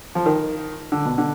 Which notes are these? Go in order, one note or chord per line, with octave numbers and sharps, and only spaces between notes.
F3
D#3
D3
B2
D3